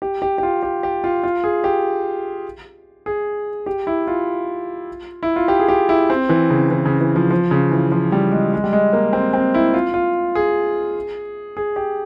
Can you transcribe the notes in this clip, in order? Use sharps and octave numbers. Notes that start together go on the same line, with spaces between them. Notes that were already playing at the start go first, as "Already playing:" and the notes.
G4
G4
G4
F4
G4
G4
F4
F4
G#4
G4
G#4
G4
E4
F4
E4
F4
G4
G#4
G4
E4
C4
E3
C#3
E3
C#3
E3
F3
F3
C#3
E3
F3
G3
G#3
G#3
G3
G#3
A#3
C4
C4
E4
F4
F4
G#4
G#4
G4